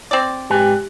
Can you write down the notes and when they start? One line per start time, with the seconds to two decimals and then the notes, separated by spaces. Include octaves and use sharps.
0.11 C4 D5
0.50 G#2 G4 B4 G#5